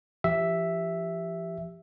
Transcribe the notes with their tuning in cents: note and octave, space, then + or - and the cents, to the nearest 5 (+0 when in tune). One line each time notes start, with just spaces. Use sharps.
F3 -40 G4 +0 E5 +0